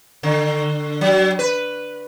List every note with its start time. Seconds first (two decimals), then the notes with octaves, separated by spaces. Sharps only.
0.23 D3
1.01 F#3
1.39 B4